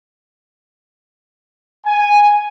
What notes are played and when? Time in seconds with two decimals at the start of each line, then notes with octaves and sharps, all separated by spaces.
1.85 G#5